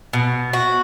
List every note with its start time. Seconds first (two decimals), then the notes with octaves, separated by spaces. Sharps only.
0.13 B2
0.53 F#4